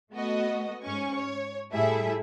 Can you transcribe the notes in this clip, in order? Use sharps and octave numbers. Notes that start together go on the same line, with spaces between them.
A3 B3 F#4 D#5
G#2 C#4 G#5 C#6
C#5
A2 G3 E4 G#4 A4 E5